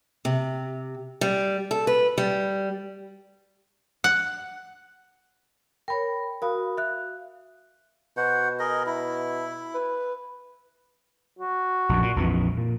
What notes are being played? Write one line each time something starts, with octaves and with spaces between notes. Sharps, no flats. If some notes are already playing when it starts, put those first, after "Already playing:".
C3
G3
A4
B4
G3
F#5
A#4 C#5 G5 B5
F#4 A#4 F5 B5 D#6
E5 F5 F#6
B2 F#4 C5 F#5
G#4 A#4 D#5
E4
B4
F#4
A#1 F#2
A#2
A#1 F2 E3
A#2